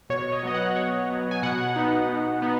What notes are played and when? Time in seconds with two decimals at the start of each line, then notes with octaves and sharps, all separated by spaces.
0.10 B2 C#5
0.32 D#5
0.39 C#5
0.43 F#3 B3 D#5
0.54 F#5
0.76 B2 C#5
1.10 F#3 B3
1.31 G#5
1.43 B2 F#5
1.76 B3 D#4
2.09 B2
2.42 B3 D#4